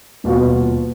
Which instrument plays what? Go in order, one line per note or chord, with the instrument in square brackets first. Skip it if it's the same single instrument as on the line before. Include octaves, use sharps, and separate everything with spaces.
[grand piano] D#1 B2 F4 F#4